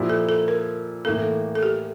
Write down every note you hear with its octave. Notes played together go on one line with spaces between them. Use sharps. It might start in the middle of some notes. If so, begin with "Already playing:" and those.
Already playing: A#2 F3 A#3 E4 G4
A4
A4
A#4
A2 E3 A#3 A4
A4
G4